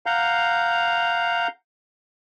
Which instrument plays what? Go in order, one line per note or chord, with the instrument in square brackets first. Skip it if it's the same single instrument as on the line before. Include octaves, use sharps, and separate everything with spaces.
[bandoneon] F5 F#5 A#5 G6